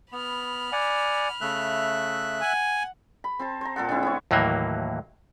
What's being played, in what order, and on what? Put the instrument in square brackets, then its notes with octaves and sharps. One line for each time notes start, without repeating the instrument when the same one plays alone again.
[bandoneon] B3 [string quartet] B5 F6
[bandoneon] D5 F#5 G#5
[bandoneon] C#3 A3 [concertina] E5 F#6
[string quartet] F#5 [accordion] G#5
[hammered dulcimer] B5
C4 C5 A5
C5 A#5
A#2 C4 A4 F#5
D3 G#3 C4 E4
B3 E4 C#5
[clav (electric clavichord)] D#2 A2 E3 F#3 A#3